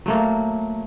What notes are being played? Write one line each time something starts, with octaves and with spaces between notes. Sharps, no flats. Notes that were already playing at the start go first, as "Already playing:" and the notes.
F#3 A3 A#3